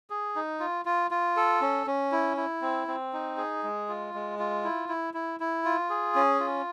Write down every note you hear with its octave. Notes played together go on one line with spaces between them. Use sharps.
G#4
D#4
F4
F4
F4
A4
C#4
C#4
E4
E4
C4
C4
D#4
G#4
G#3
F4
G#3
F4
E4
E4
E4
E4
F4
G#4
C#4
F4